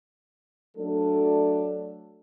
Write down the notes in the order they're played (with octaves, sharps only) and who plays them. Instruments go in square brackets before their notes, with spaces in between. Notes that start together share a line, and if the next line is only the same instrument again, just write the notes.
[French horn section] F#3 A3 D4 A4